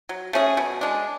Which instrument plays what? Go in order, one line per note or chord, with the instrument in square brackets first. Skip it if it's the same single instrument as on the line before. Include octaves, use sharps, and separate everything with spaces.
[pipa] F#3
A3 C#4 G#4
B2
G#3 D4